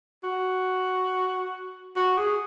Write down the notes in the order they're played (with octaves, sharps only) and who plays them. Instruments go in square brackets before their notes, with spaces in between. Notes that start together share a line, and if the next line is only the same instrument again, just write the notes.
[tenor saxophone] F#4
F#4
G#4